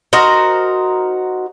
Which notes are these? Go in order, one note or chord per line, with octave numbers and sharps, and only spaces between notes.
D#4 F#4 A#4 C5